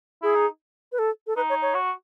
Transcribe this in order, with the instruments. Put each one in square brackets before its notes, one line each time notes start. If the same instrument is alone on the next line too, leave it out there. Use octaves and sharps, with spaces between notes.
[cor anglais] E4 [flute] G#4
[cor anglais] D#4
[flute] B4
A4
A4
[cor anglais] D#4 [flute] B4
[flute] C#5
C#5
[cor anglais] F#4